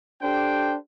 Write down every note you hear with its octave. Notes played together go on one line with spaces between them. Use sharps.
D4 G4 A4 C5 G5